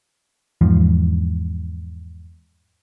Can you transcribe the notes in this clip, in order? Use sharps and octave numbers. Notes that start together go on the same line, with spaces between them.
E2 G#2 F3